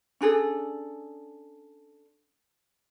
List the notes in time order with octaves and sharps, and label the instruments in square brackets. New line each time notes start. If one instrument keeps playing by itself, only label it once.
[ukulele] C#4 D4 G#4 A4